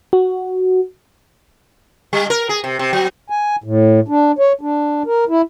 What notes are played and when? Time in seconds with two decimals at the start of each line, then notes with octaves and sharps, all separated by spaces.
0.13 F#4
2.13 G3
2.30 A#4
2.49 G#4
2.64 C3
2.79 C3
2.93 F#3
3.30 G#5
3.64 A2
4.08 D4
4.39 C#5
4.61 D4
5.06 A#4
5.29 E4